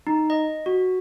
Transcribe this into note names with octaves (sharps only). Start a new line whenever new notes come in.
D#4
D#5
F#4